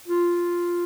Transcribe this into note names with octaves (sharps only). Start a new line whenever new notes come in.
F4